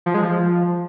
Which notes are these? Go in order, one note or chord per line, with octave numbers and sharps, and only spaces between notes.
F3
G#3
F3